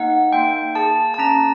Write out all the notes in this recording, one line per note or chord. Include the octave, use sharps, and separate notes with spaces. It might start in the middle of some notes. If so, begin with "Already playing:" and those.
Already playing: A#3 D#4 F#5
A#3 G5
G#4 A5
A5
C#4 A#5